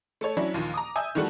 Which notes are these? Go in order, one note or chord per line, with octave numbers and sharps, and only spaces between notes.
A3 A4 C#5
F#3 C#4 D4 E4
D#2 A#2 D#3 F3
A#5 D6 D#6
E5 G#5 D#6 E6 G6
D#3 E3 G3 A3 F#4 A4